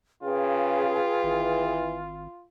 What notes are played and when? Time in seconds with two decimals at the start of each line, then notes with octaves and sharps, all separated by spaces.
0.23 C#3 F4 G#4 B4 G5
1.23 G#1 E3